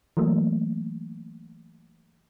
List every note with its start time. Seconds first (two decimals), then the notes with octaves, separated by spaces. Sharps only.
0.17 E3 F#3 A3 A#3